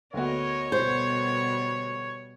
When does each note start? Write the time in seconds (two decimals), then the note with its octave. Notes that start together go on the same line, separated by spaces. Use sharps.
0.14 D2 B3 F#4 A#4 C#5 D#5
0.72 B2 G3 C5